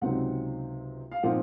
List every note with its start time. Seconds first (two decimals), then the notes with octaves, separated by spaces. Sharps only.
0.01 C#2 C3 F#3 C4 D#4 F#5
1.12 F5
1.23 A#2 F3 C4 D#4 F#5